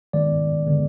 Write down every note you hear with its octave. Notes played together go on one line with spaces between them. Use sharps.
D#3 G#3 B3 D5
D3 G#3 B3